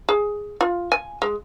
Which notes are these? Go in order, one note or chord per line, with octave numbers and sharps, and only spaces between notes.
G#4
F4
G#5
G#3